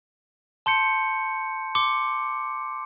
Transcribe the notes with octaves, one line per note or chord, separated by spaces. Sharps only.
A5 C6 G6 C#7
C6 D6 C#7